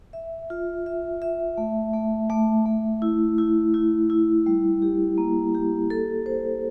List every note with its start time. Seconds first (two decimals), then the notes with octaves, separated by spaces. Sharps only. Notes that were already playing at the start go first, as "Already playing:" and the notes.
0.13 E5
0.50 F4
0.86 E5
1.22 E5
1.57 A3
1.93 A3
2.30 A3
2.66 A3
3.02 E4
3.38 E4
3.74 E4
4.10 E4
4.46 G3
4.82 G4
5.18 A#3
5.55 G4
5.90 A4
6.26 C5